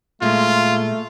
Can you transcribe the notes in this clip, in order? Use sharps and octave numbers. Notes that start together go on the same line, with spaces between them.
A#2 G#3 A3 F4